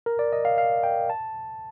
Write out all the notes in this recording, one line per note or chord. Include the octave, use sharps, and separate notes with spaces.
A#4
D5
D#5
F5
F5
G5
A5